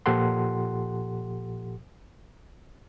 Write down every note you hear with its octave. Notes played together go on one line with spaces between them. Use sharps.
A#2 F3 G4 A4 F#5 C6